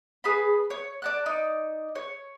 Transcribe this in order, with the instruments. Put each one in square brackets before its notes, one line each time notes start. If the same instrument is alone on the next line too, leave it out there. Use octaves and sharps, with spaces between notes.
[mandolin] G#4 B4 A5 B5
C#5
D5 A5 F#6
D#4 D5
C#5